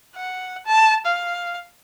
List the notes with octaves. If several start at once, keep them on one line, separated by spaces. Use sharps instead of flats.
F#5
A5
F5